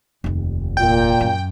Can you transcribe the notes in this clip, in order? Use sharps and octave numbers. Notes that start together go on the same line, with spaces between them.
F1 D#2
A#2 G5
F#2